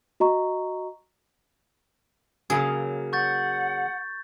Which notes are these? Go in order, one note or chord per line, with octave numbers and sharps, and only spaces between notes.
F#4 D#5 A#5 C#6
C#3 F#3 A#3 G#4
F#5 C#6 G6 A6